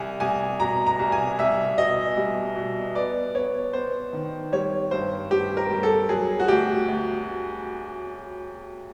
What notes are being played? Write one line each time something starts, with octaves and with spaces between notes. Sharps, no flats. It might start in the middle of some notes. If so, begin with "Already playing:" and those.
Already playing: C2 G#5
C2 G#5
B2 A#5
A#5
C2
G#5
C2 E5
B2 D#5
G3
B2
B3 D5
B3 C#5
B3 C5
D#3
G3 C#5
G2 C5
G2 G4
A#4
G3
A4
F#3 G#4
F#4
D2 G4
D2